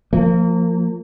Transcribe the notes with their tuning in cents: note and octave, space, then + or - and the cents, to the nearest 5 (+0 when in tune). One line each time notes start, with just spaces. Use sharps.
F3 +0 A#3 -30